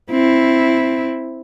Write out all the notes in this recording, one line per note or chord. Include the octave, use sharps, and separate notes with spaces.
C4 E4